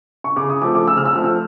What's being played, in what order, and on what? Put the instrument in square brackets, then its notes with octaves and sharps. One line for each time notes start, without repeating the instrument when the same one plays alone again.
[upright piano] C#6
[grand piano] C#3 [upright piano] D6
[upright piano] D#6
[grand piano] F3 A3 C4 [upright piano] D6
[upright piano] D6
[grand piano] C#3 [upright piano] E6
[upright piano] F6
E6
[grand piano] F3 A3 C4 [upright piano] F6
[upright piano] E6